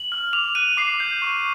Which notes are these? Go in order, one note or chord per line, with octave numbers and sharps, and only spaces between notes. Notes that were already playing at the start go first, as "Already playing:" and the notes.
Already playing: F#7
F6
D6 F7
F#6 D#7
D6 C7
G6
C#6